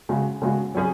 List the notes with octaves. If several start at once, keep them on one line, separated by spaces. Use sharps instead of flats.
C#3 G#3 F#4
C#3 G#3 F#4
F#3 C#4 G#4